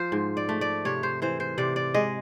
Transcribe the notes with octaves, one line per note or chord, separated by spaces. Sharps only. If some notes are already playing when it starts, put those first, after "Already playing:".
Already playing: F3 F4 C5
G#2
D5
A3
D5
C3 C#5
C5
E3 C5
C5
C3 D5
D5
G#3 D#5